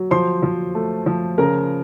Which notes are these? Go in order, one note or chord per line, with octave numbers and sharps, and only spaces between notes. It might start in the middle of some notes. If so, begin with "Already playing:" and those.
Already playing: F#3
F3 C5 C6
F3
A3
F3
C#3 A#4 A#5